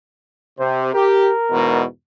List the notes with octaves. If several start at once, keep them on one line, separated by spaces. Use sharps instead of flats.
C3 C5
G4 A#4
E2 G#2 B2